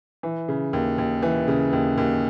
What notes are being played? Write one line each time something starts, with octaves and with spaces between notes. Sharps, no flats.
E3
C#3
D#2
D#2
E3
C#3
D#2
D#2